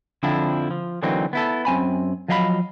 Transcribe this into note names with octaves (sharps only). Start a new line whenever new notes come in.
F2 D3 F3 C4 D4 E4
F3
D3 E3 F#3 A#3 C4 D#4
B3 E4 A4
F#2 C4 G#5 B5
F3 F#3 D#5 F5 G5 B5